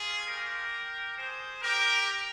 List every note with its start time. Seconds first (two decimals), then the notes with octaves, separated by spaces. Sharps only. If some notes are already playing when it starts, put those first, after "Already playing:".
Already playing: G3 C#4 F4 G#4
0.26 G4 A#4
1.16 G#4 C5
1.62 G4 A#4